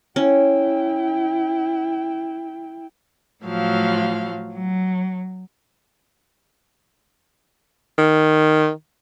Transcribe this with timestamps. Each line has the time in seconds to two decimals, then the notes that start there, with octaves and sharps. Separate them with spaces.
0.16 C#4 E4 G5
3.44 A2 F3 F#3 F5
4.54 F#3
7.98 D#3